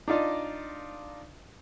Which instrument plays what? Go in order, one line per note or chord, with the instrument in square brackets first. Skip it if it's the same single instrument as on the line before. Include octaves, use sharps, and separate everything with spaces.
[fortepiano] D4 D#4 F4 D5 D#5